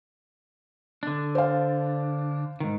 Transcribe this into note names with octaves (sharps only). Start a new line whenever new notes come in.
D3 D4
C5 F5
G#2 D#3